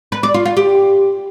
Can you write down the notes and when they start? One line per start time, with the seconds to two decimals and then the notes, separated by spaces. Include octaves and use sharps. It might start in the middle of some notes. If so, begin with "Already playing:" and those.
0.12 B4
0.23 D5
0.34 F4
0.45 F4
0.57 G4